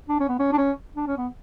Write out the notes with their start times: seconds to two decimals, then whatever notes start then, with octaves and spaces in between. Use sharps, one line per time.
0.09 D4
0.20 C#4
0.29 B3
0.39 C#4
0.52 D4
0.58 C#4
0.96 D4
1.07 C#4
1.17 B3